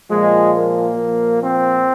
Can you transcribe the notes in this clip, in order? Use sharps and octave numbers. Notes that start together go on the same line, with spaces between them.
A#2 F3 G#3
A#3
A#2 F3
C4